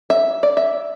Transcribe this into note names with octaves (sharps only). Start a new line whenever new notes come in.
E5
D5
E5